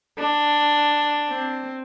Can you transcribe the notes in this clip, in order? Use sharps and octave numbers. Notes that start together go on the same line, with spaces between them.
D4
C4